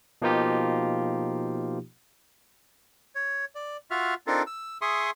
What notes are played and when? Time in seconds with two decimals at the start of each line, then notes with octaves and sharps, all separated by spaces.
0.22 B2 F3 A#3 D#4 F4 G4
3.15 C#5
3.55 D5
3.91 F4 F#4 E5 F6
4.27 C4 D4 D#4 F4 A4 A#4
4.47 E6
4.82 G#4 E5 C6 C#6 D#6